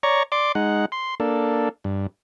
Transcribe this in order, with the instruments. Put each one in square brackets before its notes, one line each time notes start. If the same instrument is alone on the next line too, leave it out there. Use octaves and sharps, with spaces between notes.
[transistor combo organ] C#5 D5 A#5 C#6
D5 C6 D6
G#3 D#4 F#5
C6
A#3 D4 A4
G2